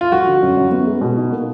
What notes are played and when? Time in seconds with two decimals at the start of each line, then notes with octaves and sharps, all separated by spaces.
0.01 F4
0.12 F3 F#4
0.27 D3
0.42 F#2
0.57 F#2
0.71 B3
0.87 G#3
1.01 B2
1.17 D#4
1.32 A#3